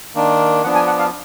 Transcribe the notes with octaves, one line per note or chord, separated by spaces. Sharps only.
D#3 A#3 D4
F3 B3 D4 F#5
G#5
F#5
F5